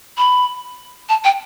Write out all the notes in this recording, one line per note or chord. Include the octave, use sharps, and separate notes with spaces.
B5
A5
G5